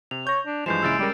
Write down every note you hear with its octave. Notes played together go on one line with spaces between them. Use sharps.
C3 F7
C#5 G6 A#6
D4
G2 E3 F3 G#3 G6 C7 E7
A#1 C#3 E4 E6 A6 D7
G3 G#3 C#4 A#4